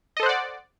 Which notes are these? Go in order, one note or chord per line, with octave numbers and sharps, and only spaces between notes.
A4 C5 D5 D#5 F#5